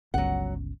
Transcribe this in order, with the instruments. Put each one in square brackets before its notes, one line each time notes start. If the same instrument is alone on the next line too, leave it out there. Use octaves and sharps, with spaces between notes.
[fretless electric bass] G1 C#2 [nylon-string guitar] F#3 F#5